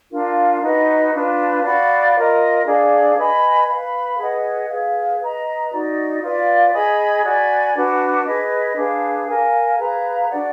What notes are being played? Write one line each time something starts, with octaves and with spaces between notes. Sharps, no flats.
D4 F4 A#4 F5
D#4 F#4 B4 D#5
D4 F4 B4
F#4 D5 F5 B5
F4 A#4 D#5
D4 G#4 D5 F5
B4 D#5 G#5 B5
B4 F5 B5
G#4 B4 D#5 F#5
G#4 B4 F5
B4 D#5 A#5
D#4 F#4 D5
F4 B4 D5 F5
G#4 D#5 G#5 B5
F#4 D5 G#5 B5
D4 F#4 B4
G#4 B4 D#5
D4 G#4 B4 F5
A#4 F5 G#5
G#4 B4 F5 A#5
D4 F#4 D5 F#5